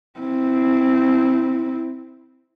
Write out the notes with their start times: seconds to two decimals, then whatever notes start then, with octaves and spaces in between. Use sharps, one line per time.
0.20 C4 E4